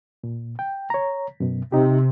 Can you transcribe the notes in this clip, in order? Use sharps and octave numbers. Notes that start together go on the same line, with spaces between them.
A#2
G5
C#5 A#5
F#2 B2
C3 D#4 G4